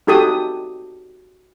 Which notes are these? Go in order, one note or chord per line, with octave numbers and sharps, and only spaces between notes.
D#4 F#4 G4 A4 D#6